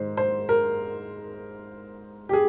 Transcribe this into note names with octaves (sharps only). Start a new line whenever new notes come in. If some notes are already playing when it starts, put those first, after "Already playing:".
Already playing: G#2 D#3 C5
C5
A#4
G4
G#4